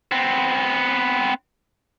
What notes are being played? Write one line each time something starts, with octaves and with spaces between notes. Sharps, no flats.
B3 C4